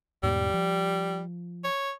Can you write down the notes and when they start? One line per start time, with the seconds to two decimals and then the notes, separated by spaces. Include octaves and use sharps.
0.23 E2 G#2 B2 G3
0.54 F3
1.64 C#5